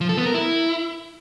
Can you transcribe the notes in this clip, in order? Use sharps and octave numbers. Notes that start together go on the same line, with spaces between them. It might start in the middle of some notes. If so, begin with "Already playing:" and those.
F3
A4
B3
A#4
E4